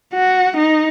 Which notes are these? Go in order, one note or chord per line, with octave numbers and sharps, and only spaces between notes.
F#4
D#4